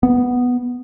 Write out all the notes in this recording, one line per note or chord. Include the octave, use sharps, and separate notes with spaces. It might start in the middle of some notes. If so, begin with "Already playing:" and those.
B3